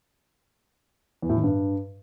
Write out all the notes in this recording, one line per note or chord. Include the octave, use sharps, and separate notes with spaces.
E2
A2
D#3
G2